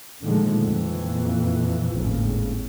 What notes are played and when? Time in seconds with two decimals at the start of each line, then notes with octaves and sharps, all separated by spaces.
0.22 A#2 D3 D#3 F3 G#3 A3
0.63 F2 A#2 E3
1.95 G#1 D#2 A2 C#3